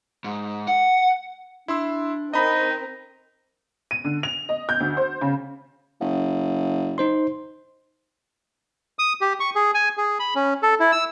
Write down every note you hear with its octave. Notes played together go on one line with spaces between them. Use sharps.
G#2
F#5
D4 E4 C6 E6
C4 D#4 A#4 D#5 B5
D#7
D3
F7
D#5
G6
D2
C5
C#3
F#1
D#4 C5 C6
D#6
G4
C#6
G#4
G#5
G#4
B5
C#4
A4
E4
E6